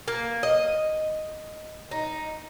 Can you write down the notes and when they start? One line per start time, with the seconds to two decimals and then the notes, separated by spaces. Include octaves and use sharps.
0.08 A#3
0.43 D#5
1.91 D#4